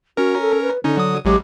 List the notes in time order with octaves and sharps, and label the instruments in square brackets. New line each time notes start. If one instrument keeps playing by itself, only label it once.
[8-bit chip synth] C#4 A#4 [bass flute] F#4
[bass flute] A4
B4
[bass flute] D3 [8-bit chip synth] C#4 D#4
[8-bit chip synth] F#3 D#6
[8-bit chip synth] A1 F#3 G#3 [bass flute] G4